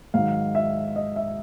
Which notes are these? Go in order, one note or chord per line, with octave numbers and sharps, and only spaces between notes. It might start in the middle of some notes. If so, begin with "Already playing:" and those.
G#2 D#3 F#3 F5
E5
D#5
E5